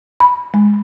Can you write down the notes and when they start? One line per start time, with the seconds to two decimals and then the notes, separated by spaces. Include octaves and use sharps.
0.20 B5
0.54 G#3